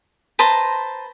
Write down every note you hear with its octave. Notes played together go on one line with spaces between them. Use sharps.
B4 C5 A5 A#5